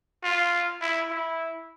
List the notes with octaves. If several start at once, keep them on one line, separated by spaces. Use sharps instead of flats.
F4
E4
E4